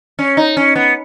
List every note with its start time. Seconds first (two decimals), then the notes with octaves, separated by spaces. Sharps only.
0.19 C#4
0.37 D#4
0.57 C#4
0.75 B3